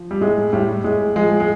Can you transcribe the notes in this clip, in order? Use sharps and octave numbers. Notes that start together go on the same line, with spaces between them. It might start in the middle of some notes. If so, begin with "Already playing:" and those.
Already playing: F3
G3
A2 G#3
A2 G3
A2 G#3
F3 G#3
G#3